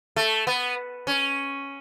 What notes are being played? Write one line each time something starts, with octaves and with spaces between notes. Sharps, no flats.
A3
B3
C#4